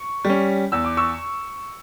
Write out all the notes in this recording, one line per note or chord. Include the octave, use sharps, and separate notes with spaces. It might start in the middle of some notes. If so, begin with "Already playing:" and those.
Already playing: C#6
G3
C#4
E2 E6
D6
C#6 E6